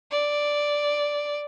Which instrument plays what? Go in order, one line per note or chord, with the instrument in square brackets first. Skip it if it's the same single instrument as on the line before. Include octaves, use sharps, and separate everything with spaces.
[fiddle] D5